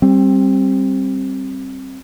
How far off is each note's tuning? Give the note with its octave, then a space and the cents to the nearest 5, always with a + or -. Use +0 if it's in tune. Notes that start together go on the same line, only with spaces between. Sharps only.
G3 +0 C4 +20